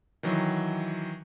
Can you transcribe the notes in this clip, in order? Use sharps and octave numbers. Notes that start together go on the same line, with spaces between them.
D#3 E3 F#3